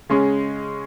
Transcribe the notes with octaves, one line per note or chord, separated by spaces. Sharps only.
C#3 G#3 C#4